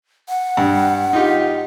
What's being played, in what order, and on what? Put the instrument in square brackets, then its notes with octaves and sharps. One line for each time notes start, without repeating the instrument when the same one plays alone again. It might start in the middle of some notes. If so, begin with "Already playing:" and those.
[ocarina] F#5
[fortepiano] G2
D#4 F4 G4